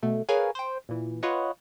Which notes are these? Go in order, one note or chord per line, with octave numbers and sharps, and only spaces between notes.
B2 A3
G#4 A#4 B4 C#5 F5 G#5
C5 G5
A#2 E3
F4 B4 C#5 D#5 F#5